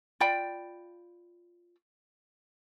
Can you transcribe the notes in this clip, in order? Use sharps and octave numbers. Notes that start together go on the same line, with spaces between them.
F4 D5 G5 B5